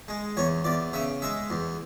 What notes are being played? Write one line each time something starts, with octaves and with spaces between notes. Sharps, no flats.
G#3
E2 C#5
E2 D5
C#3 E5
G#3 E5
E2